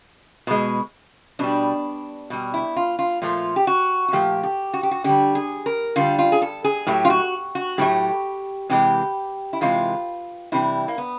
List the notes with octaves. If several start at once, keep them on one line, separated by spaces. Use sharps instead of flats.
B2 G#3
B2 G3 D4
B2 G3
E4
F4
F4
A#2 F3 A3 F4
G4
F#4
F#4
A#2 F3 A3 G4
G4
F#4
G4
F#4
D3 G3 G4
G#4
A#4
D3 G3 F4
F4
G#4
A4
G#4
A2 F#3 A3 G4
F4
F#4
F#4
A2 F#3 A3 G4
C3 E3 G#3 G4
E4
C3 E3 G#3 F4
C3 E3 G3 E4
A#3
B3